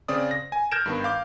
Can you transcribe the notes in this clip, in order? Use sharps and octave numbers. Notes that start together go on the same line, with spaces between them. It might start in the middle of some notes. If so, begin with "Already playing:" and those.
C#3 C4 D5 D#6
A#6
G#5
F6 G6 G#6 A#6 D7 E7
G2 D#3 B3
F5 D6 G6